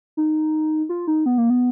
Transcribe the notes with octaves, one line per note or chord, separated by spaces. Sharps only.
D#4
F4
D#4
B3
A#3
B3